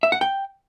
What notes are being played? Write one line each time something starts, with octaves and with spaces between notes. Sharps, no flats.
E5
F#5
G5